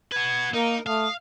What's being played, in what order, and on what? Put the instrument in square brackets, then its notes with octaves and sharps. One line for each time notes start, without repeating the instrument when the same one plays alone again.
[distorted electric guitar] F#4 B4 [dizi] G#6
[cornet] A#3 [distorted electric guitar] D#4 [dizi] A#4
[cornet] A3 [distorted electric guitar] F5 [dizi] D#6